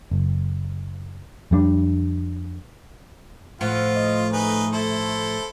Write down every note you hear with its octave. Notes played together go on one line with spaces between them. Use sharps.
F#1
F2 G3 D4
A2 F3 F4 F#5
D#5
A3 D#4 G#4 B4
E4 A4 C5